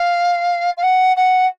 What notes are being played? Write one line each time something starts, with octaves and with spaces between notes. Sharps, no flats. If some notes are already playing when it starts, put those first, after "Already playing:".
Already playing: F5
F5
F#5
F#5